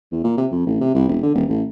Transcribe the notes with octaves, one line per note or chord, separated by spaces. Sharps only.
E2
A#2
C3
F2
A1
C3
C2
E1
D3
D#1
A1